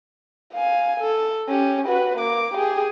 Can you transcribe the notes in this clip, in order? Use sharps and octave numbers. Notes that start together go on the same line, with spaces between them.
F5 G#5
A4
C#4 G4
F#4 B4
A#3 D6
G4 G#4